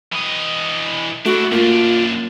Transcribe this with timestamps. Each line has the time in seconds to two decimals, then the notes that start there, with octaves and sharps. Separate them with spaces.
0.12 E3 D#5
1.26 A3 D4 E4 F#4
1.52 F#2 A#3 D4 F4